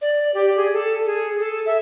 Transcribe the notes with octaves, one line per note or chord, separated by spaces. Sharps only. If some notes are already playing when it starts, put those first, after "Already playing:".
D5
G4
G#4
A4
G#4
A4
E5